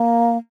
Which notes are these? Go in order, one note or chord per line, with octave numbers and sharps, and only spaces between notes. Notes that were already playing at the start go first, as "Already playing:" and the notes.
Already playing: A#3